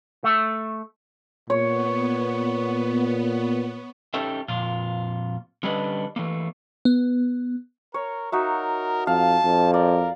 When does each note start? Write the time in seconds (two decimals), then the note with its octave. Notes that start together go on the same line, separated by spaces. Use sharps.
0.24 A3
1.50 A#2 B3 C#5
4.14 C#4 D#4 G4 A4 E5
4.48 F2 A#2 F4
5.63 D3 G3 C#4 D4 B4 D#5
6.16 E3 A3 A#3
6.85 B3
7.94 A#4 C#5
8.32 D#4 F#4 A#4 E5
9.07 F2 F5 A5
9.45 F2
9.74 A#4 D5